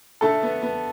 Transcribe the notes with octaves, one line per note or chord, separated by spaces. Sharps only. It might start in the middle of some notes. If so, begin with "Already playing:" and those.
D3 A3 A4
B3
B3